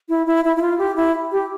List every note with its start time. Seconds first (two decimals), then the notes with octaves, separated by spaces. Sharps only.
0.09 E4
0.26 E4
0.44 E4
0.56 E4
0.61 F4
0.78 G4
0.96 E4
1.32 G4